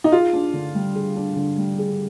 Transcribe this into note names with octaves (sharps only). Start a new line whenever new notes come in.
D#4
F4 G#4
D4
D3
G3
G#4
D4
D3
G3
G#4